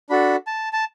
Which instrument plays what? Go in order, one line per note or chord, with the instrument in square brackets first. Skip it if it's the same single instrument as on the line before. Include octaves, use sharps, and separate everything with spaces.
[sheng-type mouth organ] D4 F#4 A4 B5
A5
A5